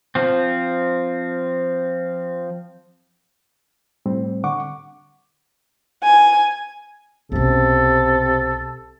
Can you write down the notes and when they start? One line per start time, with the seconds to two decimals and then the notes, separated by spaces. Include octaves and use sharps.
0.15 F3 C4
4.06 A2 G3 C4
4.44 D3 F#5 C#6 D6
6.03 G#5
7.32 B1 C3 C#4 A4